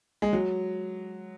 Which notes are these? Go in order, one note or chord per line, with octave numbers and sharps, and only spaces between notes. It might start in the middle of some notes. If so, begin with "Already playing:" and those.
G#3
F#3